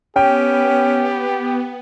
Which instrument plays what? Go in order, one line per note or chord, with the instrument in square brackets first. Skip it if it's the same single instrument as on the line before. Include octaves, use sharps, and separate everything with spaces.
[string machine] B3 [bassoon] C#4 [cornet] G4 [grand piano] G5